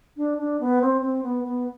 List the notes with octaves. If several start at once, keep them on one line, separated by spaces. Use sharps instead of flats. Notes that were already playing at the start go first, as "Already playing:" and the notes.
D4
D4
B3
C4
C4
B3
B3